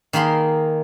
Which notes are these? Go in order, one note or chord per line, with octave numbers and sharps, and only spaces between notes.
D#3 A#3 G#4 B5 C6